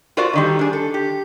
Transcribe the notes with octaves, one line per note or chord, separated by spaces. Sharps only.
F4 F#4 A#4 C5 D5 F5
D3 D#3 G3
D4 G#4
A4
G4